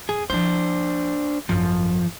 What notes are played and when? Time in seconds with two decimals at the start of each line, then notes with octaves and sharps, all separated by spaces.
0.09 F2 G#4
0.30 F3 D4 E4 C5
1.49 G#1 F#2 F3